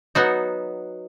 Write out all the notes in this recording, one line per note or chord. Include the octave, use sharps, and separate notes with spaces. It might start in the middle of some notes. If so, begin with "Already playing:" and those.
F#3 B3 D#4 F#4